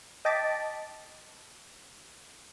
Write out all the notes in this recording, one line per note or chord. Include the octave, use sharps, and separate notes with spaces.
D#5 G5 A5 D6 A6 B6